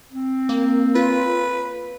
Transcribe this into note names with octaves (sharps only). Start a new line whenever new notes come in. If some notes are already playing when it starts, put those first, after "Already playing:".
C4
A#3
F4 B4